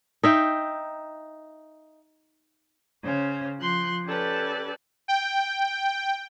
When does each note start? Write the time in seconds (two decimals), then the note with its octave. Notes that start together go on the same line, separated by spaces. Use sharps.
0.24 D#4 E5 G5
3.03 C#3 C#4 C5
3.59 F3 C6 F#6
4.05 C#4 G4 A4 B4 D5
5.08 G5